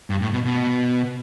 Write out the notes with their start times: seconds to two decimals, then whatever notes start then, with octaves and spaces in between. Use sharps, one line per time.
0.10 G2
0.22 A2
0.33 B2
0.45 B2